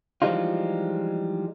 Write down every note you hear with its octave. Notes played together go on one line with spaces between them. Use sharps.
E3 F3 G3 G#3 D#4 F4